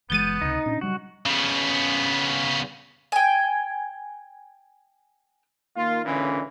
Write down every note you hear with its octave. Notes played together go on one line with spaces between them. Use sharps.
F#1 E3 G#3 B3 G6 A6 D#7
C#2 C3 D#4
A#2 C#4 D4
C#3 F#3 G3 F#4
C#3 B3
G5 G#5
D#3 A#3 F4
C#2 A#2 D3 E3 C#4